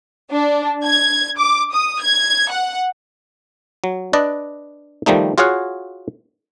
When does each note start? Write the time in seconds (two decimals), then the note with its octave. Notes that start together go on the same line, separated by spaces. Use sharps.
0.31 D4
0.84 G#6
1.38 D6
1.73 D#6
2.02 G#6
2.51 F#5
3.84 F#3
4.13 D4 B4 D5 D#5
5.06 D#3 F3 G3 A3 D#4
5.38 F4 F#4 G#4 C#5 F5 F#5